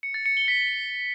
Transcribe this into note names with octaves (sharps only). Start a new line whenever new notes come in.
C#7
A6
C#7
G7
B6